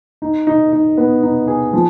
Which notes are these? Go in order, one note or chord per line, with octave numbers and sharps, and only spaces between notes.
D#4
D#4
D#4
B3
D#4
G#4
F3